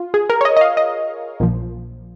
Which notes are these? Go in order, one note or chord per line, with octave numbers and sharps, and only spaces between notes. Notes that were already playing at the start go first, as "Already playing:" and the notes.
Already playing: F4
G#4
A#4
C#5
D#5
D#5
F5
D#5
A#1 A#2 F3